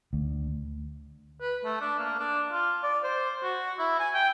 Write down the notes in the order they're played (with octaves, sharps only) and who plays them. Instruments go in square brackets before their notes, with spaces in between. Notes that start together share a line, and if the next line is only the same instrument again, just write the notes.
[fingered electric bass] D2
[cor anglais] B4
A3
D4
A#3
D4
F4
D5
C5
F#4
E4
G#5
G5